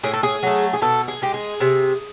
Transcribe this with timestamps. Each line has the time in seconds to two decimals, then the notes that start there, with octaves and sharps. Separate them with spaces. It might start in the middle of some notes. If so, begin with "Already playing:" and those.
0.03 A2 G#4
0.13 A4
0.23 G#4
0.43 F#3 A3
0.73 G#4
0.81 B2 A4
1.08 G#4
1.22 G#3 G4
1.34 G#4
1.60 C3